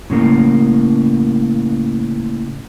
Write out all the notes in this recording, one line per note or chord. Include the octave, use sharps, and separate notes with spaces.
A2 C#3 A#3